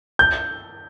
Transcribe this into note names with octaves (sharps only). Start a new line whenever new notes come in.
G6